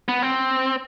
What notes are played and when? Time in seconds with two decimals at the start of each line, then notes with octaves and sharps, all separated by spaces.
0.09 B3
0.22 C4